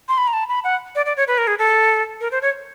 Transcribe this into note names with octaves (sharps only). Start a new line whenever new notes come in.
C6
B5
A#5
A5
B5
F#5
D5
D5
C#5
B4
A#4
G#4
A4
A#4
C5
C#5